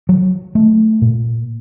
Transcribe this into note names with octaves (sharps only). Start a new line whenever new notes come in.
F#3
A3
A#2